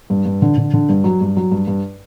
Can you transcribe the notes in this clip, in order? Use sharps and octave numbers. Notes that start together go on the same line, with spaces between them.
G2
G2
D3
D3
D3
G2
F#3
G2
F#3
G2
G2